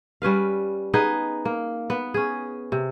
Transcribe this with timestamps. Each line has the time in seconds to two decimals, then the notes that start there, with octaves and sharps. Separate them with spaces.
0.22 G3 C#4 B4 F5
0.94 B3 D#4 G#4 B4
1.45 A#3
1.90 B3
2.14 C#4 G#4
2.72 C3